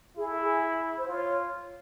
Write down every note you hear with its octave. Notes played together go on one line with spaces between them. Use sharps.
E4 G#4
A4
G#4
C5
F4 C#5